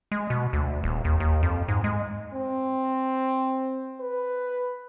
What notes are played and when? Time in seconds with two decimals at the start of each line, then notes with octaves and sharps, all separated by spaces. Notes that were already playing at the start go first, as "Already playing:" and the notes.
0.12 G#3
0.30 B2
0.53 D2
0.84 D#1
1.05 D#2
1.20 D#2
1.43 F2
1.68 G#2
1.84 G#3
2.34 C4
4.00 B4